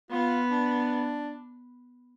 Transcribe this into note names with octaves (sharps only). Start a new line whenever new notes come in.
B3 F4
D4